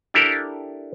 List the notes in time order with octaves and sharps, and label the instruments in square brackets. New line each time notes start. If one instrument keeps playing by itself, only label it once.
[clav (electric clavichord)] D4 E4 G4 A4 A#4